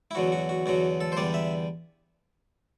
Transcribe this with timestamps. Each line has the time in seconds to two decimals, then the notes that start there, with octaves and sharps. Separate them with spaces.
0.11 E4
0.15 E2 D3 F#3 F#4
0.32 F#4
0.49 F#4
0.66 E2 D3 F#3 F#4
1.01 A4
1.12 C5
1.17 E2 D3 G3 D5
1.34 E5